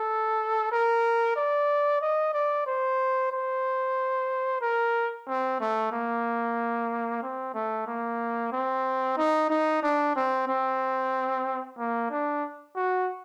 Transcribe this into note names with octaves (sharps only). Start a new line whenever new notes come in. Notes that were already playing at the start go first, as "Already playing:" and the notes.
Already playing: A4
A#4
D5
D#5
D5
C5
C5
A#4
C4
A3
A#3
C4
A3
A#3
C4
D#4
D#4
D4
C4
C4
A#3
D4
F#4